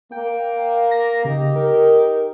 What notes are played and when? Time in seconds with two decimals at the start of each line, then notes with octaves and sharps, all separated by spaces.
0.12 A#3 G5
0.91 A#6
1.25 C#3 D#4 G4
1.56 A#4